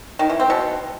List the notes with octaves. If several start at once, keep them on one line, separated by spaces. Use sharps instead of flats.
D#3
E3
C4
B2